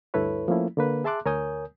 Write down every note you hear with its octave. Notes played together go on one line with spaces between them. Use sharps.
D2 G2 E4 A4 B4 C#5
F3 A3 A#3 C#4 E4
D3 A#3 B4
G#4 E5 A5 C6 D6 F#6
D2 A#4 C#5 G#5 D#6 G6